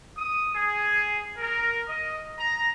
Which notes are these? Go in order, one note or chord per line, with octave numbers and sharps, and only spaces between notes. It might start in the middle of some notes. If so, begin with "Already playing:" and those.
D#6
G#4
A#4
D#5
A#5